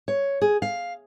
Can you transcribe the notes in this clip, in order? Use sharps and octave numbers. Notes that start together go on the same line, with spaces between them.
C#5
G#4
F5